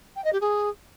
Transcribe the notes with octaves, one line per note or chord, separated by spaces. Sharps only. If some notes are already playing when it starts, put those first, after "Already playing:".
G5
D#5
G4
G#4